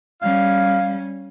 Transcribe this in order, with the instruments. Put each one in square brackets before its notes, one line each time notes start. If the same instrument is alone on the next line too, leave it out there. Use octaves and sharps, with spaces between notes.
[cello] G3 C#4 [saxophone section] F5